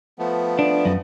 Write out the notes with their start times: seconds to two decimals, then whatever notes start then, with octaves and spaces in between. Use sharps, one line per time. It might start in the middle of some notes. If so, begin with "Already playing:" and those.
0.19 F3 A3 B3
0.59 D4
0.85 F#2